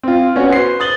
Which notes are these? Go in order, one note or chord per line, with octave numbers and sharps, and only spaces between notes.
C4 F4
B3 C#4 F#4 C#5
B4 C5 C7
D#6 A6 F#7 G7